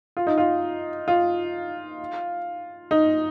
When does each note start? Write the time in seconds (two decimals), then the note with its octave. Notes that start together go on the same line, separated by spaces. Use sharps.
0.17 F4
0.27 D#4
0.38 F4
1.08 F4
2.91 D#4